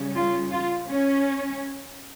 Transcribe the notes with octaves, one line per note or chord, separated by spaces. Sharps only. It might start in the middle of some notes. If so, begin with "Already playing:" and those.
Already playing: C#3 G3 C#4
F4
F4
C#4